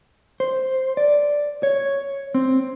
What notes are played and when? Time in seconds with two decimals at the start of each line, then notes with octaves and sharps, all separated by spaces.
0.40 C5
0.97 D5
1.63 C#5
2.34 C4